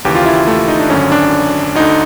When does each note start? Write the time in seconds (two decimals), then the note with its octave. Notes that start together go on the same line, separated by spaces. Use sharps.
0.04 D#2 C#3 E3 G4
0.15 F4
0.26 E4
0.48 A3
0.59 A3
0.68 D#4
0.79 D4
0.90 G#1 F#2 D3 C#4
1.12 D4
1.75 D2 D3 D#4